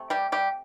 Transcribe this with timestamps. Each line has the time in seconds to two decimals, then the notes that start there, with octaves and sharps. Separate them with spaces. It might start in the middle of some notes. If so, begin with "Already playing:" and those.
Already playing: C3 A3
0.10 G3 G4
0.32 G3 G4